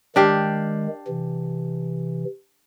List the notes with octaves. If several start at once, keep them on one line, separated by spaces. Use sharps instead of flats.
D#3 G#3 D4 G4 F5
C3 E3